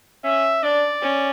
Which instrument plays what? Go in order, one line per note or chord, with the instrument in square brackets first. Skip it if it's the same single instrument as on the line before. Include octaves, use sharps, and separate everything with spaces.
[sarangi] C#4 [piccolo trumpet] E5
[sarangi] D4 [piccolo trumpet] D5
[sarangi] C#4